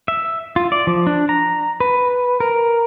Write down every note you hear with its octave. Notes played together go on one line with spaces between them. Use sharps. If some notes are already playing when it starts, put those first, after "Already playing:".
E5
F4
D5
F3
D4
A#5
B4
A#4